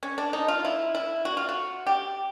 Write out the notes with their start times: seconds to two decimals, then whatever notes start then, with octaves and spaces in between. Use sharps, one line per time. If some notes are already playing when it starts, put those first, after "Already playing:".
0.03 C#4
0.18 D4
0.33 D#4
0.48 F4
0.65 E4
0.95 E4
1.25 F#4
1.37 F4
1.49 F#4
1.87 G4